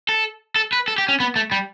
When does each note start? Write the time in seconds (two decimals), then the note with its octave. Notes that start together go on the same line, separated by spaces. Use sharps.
0.09 A4
0.56 A4
0.73 B4
0.88 A4
0.98 G4
1.09 C#4
1.20 B3
1.36 A3
1.52 G3